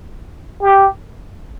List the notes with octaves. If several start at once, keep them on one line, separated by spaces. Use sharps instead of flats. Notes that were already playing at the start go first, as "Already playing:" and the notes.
G4